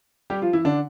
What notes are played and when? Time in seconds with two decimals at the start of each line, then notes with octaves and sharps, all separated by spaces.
0.30 G3 G4
0.42 F3 F4
0.53 E3 E4
0.65 D3 D4